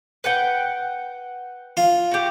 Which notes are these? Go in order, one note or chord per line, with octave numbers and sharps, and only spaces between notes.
B4 F#5 G5
F4
F#4 G4